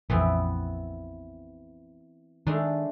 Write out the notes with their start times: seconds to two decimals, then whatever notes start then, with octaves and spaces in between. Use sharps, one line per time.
0.10 A#1 F2 E3 B3 C4
2.47 D#3 G#3 A3 D4